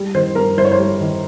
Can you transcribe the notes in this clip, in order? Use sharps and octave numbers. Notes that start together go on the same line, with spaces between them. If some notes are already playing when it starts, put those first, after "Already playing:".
Already playing: G3
D#3 C5
G2 A#4
G1 C5
C#5
C5
G3
D#3